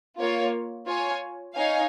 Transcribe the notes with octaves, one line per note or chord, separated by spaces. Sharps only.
A#3 F4 C#5
F4 C#5 G#5
D#4 C#5 F5 G#5